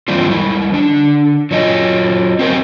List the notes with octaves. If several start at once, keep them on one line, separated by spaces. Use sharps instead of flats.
E3 G3 C4 D4 E4 F4
G3 G#3 E4
D3 D4
F#3 F4 C#5 D#5
C4 F#4 G4 A#4 C5 D#5